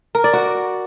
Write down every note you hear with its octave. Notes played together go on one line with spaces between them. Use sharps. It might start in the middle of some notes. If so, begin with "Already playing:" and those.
A#4
D5
F#4